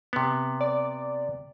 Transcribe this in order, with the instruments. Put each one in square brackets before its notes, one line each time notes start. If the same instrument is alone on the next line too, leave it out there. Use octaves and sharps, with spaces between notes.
[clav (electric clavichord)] C3 B3
[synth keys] D5